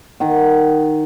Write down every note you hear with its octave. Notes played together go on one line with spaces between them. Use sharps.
D#3 F#5